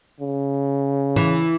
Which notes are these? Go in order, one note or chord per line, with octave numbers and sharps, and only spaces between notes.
C#3
E3